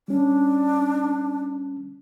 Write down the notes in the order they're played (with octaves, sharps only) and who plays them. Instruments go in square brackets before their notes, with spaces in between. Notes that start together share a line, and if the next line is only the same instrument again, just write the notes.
[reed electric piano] G3 C#4 [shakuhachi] D4